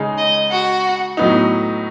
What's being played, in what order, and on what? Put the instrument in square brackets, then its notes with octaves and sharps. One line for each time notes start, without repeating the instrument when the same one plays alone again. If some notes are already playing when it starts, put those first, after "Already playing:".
Already playing: [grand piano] C#3 G#3 D#4
[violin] D#5
F#4
[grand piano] A2 F#3 B3 D#4